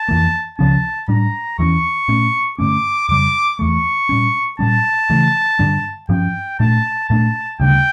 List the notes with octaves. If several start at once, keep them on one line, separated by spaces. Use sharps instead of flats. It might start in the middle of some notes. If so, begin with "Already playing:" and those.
Already playing: A5
F2 E3 A#3
C#2 C#3 F3 C#4 A5
A2 G3 D4 A#5
E2 E3 A3 C#4 C#6
A#2 A3 C#4
G2 D3 A3 C#4 D6
F2 C#3 G3 D6
E2 E3 A3 C#6
A#2 G3 C#4
A#2 G3 C#4 A5
C#3 E3 A3
G2 D3 G3 D4
G2 F3 C#4 G5
A#2 A3 D4 A5
A#2 A3 D4 A5
D2 C#3 G3 D4 G5